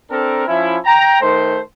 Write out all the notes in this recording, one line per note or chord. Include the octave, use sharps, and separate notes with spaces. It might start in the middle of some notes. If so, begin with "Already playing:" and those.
C4 D4 A4 A#4
F3 C#4 E4
G5 A#5
D#3 A3 C5